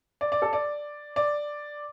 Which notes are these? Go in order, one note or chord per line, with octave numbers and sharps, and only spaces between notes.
D5
D5
A4
D5
D5